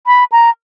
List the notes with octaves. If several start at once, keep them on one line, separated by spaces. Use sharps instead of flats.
B5
A#5